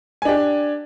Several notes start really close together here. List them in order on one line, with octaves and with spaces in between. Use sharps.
G#5 D4 G4